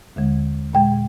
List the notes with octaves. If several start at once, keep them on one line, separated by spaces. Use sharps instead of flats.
D#2 D3 G#3
A#2 G#3 G5